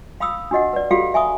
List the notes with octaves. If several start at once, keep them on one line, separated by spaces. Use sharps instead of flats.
F5 B5 D#6 E6
D4 F#4 D#5 F#5
B4 D5
F#4 G4 A4 F5 B5
E5 G#5 B5 C#6 D#6